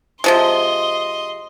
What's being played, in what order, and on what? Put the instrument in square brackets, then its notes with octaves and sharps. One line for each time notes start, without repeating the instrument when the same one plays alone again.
[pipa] C3 F3 G#3 [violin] D#5 C6